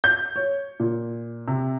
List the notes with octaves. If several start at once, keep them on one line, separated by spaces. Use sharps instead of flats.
G6
C#5
A#2
C3